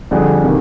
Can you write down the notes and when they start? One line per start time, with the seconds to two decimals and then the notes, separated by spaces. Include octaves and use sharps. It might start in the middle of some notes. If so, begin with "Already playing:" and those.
0.11 F2 D3 G3 D4 G#4
0.44 C3 D#3 A#3